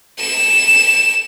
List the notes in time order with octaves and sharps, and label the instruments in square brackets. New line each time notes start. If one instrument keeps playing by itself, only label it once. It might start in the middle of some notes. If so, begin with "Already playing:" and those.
[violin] E7